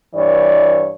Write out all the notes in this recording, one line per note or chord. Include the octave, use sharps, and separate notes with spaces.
G2 E3 C#5 D5